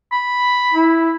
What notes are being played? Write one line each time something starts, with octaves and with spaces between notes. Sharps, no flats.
B5
E4